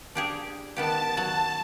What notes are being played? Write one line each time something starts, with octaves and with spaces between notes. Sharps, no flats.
D4 G4 G#4
D#3 B3 G4 A5
F#3